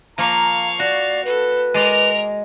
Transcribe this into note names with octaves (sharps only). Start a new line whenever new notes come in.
F3 A#3 F5 A#5 C#6
F#4 D5
A4 B4
G#3 A#4 D5 D#5 F6